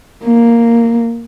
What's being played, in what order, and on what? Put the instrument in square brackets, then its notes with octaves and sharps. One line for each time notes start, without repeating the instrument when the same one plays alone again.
[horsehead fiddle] A#3